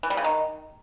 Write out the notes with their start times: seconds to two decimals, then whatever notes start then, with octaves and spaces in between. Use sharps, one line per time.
0.03 E3
0.10 G3
0.17 C#3
0.24 D#3